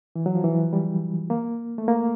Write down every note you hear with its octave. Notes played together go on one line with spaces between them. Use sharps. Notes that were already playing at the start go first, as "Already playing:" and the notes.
E3
F#3
F3
E3
G3
A#3
A3
A#3